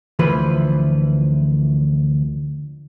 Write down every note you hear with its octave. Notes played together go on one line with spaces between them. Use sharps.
D2 E3 F3 B4